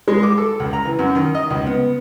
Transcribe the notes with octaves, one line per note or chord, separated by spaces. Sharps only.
G#3
D6
A4
C#2
A#5
E3
F#2
D#3
D#5
C#2
B3